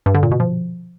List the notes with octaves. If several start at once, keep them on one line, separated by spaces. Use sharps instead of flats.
G2
D3
A#2
B2
F3